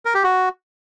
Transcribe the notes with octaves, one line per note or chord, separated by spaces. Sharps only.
A#4
G4
F#4